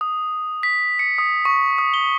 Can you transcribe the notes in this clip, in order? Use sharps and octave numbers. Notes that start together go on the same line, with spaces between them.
D#6
B6
C#7
D#6
C#6
D#6
G7